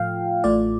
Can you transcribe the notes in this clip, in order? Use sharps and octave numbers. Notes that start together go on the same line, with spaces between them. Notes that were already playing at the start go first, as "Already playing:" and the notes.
Already playing: A2 F3 A3 F4 F5 G5
A1 A2 A3 F4 D5